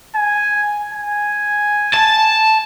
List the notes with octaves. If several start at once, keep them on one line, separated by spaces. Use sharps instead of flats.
G#5
G#5
A5